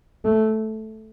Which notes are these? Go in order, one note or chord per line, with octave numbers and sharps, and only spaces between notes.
A3